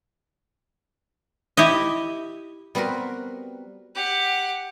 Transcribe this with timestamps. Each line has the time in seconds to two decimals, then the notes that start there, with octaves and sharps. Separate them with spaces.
1.57 E4 G4 D#5
2.75 G3 B3 C4 F#4 A#4 B4
3.95 G4 F#5